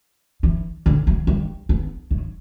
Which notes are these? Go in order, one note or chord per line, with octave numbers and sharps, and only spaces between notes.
E3
D3
F#3
G3
B3
F#3